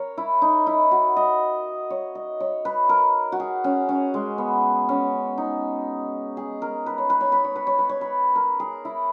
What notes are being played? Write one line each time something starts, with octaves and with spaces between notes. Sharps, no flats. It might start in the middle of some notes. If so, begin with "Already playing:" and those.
Already playing: A#4 C#5
E4
D#4
E4
F#4
D#5
C#5
D#5
C#5
B4
A#4
F#4
G#4
C#4
C#4
G#3
B3
C#4
D#4
G#4
A#4
B4
C#5
B4
C#5
B4
C#5
B4
C#5
B4
C#5
B4
A#4
G#4
E4